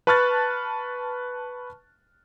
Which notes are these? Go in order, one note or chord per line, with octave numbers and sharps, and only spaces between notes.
B4 A5 C#6 F6 F#6 A6